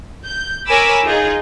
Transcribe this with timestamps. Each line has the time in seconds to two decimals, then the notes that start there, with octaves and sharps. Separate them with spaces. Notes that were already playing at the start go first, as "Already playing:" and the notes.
0.25 G6
0.67 A#4 C#5 G#5 B5 D6 E6
1.05 D#4 F4 G#4